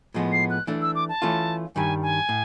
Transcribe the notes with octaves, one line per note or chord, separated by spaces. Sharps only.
A2 F3 G#3 B3
C7
F#6
E3 A3 D4
E6
D6
A5
E3 A3 C#4 F4
G2 D#3 G3 G#5
G#5
A2